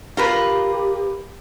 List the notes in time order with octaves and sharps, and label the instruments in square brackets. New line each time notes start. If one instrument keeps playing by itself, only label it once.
[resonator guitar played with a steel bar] F4 A#4 B4 [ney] G4